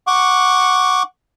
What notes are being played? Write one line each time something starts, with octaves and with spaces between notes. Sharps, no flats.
F#5 C#6 D6